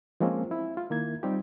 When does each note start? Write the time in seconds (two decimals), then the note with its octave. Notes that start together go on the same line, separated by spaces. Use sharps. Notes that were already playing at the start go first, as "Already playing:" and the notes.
0.20 F3 G#3 A#3 C4 C#4
0.51 C4 E4
0.77 F4
0.90 D#3 A#3 E4 G#6
1.23 G3 C4 D#4 F4 G4